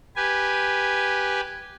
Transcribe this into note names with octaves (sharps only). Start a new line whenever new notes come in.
G4 B4 G#5